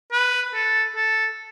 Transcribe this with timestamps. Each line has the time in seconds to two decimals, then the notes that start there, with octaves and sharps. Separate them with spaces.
0.12 B4
0.54 A4
0.96 A4